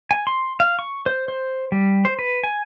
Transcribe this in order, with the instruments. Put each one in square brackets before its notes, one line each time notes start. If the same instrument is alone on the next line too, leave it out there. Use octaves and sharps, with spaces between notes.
[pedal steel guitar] G#5
C6
F5
C#6
C5
C5
G3
C5
B4
G#5